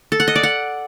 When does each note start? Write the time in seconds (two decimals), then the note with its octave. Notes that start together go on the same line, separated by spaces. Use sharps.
0.12 A4
0.20 F#5
0.28 D#5
0.36 D5
0.43 F#5